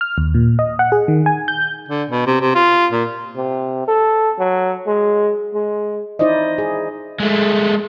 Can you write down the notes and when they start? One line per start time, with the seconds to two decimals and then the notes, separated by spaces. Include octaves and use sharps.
0.01 F6
0.18 D#2
0.34 A#2
0.59 D#5
0.79 F#5
0.92 G#4
1.08 D#3
1.26 G#5
1.48 G6
1.89 D3
2.10 B2
2.26 C3
2.41 C3
2.55 F4
2.92 A#2
3.36 C3
3.88 A4
4.39 F#3
4.87 G#3
5.54 G#3
6.19 D#4 E4 C5 D5 D#5
6.58 G#4
7.20 G#3 A3